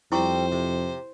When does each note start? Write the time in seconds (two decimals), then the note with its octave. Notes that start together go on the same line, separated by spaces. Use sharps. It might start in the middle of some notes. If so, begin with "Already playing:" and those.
0.12 F2 G3 C4 E4 C5 C#6
0.52 C3